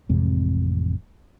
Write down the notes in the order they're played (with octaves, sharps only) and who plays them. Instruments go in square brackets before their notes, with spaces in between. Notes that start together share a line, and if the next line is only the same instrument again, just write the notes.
[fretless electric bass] A1 F2 C3 G#3